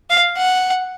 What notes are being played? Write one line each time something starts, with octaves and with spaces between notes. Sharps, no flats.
F5
F#5